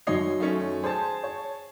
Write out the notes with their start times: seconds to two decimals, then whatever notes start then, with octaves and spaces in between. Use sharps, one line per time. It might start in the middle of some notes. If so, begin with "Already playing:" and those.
0.07 F#2 D#3 C#5 D#5 C7
0.40 A3 C#4
0.84 G#4 C5 A5
1.23 C#5